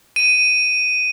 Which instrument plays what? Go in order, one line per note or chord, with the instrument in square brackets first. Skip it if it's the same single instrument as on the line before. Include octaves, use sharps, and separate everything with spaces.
[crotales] D#7